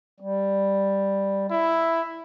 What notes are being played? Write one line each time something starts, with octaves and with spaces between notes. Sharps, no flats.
G3
E4